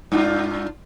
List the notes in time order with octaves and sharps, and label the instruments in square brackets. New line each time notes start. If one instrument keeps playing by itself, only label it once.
[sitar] G2 D4 F4